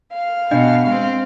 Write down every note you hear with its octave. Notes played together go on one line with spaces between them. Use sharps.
F5
B2 D4 D#5
G#3 C4